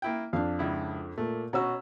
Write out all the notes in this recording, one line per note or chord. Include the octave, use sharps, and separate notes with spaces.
A#3 E4 G5
F2 D4 F5
C#2 E4
A#2 A3 A#3
B2 C#4 F#4 A#5 E6